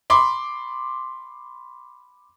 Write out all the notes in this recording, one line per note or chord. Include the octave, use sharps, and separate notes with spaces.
B5 C6 D6